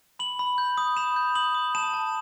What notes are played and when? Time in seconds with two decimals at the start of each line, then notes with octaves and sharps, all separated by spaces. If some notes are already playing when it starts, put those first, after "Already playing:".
0.19 B5 F#7
0.39 B5
0.58 G6
0.77 D#6
0.97 B5 E7
1.16 G6
1.35 D#6 F#7
1.55 D#6
1.75 A5 E7
1.93 A5